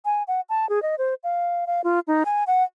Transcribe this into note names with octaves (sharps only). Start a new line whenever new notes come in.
G#5
F#5
A5
G#4
D#5
C5
F5
F5
F4
D#4
G#5
F#5